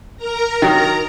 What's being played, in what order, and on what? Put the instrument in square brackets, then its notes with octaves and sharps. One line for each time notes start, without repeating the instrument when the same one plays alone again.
[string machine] A#4 A#5
[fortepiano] D#3 F#3